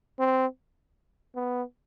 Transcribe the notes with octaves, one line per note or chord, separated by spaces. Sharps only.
C4
B3